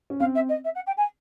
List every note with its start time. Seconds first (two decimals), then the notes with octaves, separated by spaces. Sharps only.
0.10 C#4
0.20 C4 F5
0.35 E5
0.49 D#5
0.64 E5
0.75 F#5
0.86 G5
0.97 G#5